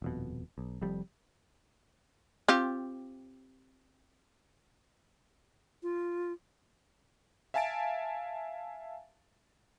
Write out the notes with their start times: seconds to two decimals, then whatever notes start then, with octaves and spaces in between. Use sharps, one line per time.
0.02 D#1 F2 B2
0.58 B1
0.81 F1 F2 G3
2.48 C4 F4 G4
5.83 F4
7.54 E5 F5 G#5 A5 A6 D7